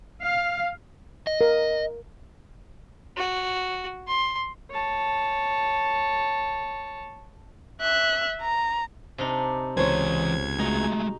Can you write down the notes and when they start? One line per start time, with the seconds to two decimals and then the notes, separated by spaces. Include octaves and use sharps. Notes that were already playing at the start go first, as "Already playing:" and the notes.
0.20 F5
1.27 D#5
1.41 A#4
3.17 F#4
4.07 C6
4.71 C#5 A5
7.81 E5 F#6
8.42 A#5
9.18 C3 D4 D#4
9.77 C#2 E3 C5 C#5 A#5 G#6
10.59 G#3 A3 D#4 F#4 G#4